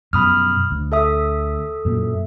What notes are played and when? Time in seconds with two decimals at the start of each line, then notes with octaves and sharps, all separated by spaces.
0.13 F#2 B2 F3 B5 D#6 F6
0.71 D2
0.92 A4 E5 D#6
1.85 F#2 A#2 F#3